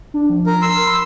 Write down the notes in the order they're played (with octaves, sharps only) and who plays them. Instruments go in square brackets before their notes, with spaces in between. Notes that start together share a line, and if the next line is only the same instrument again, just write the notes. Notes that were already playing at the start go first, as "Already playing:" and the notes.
[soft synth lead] D4
F3
[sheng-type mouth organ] A#4
C6 E6
[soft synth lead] B5